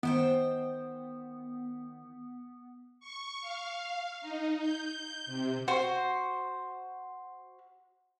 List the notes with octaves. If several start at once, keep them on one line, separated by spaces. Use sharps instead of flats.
D#3 B3 C5 G5
C#6
F5
D#4
G6
C3
F#4 C5